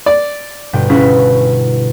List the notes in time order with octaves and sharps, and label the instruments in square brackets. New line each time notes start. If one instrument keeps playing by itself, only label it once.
[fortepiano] D5
[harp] G1 B2 G5
[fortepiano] C#3 [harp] E4 B4